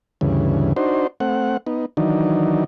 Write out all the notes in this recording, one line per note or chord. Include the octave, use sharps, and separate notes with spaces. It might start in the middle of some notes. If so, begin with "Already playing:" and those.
D2 G2 C#3 E3
D4 D#4 F#4 C5
A3 C4 F#5
B3 D#4
D#3 E3 F#3 D4 D#4